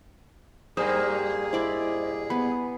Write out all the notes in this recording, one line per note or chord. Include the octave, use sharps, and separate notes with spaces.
G2 G3 A#3 G#4 C5 D#6
E4 C5 D5 D#5 B5 D6
B3 B5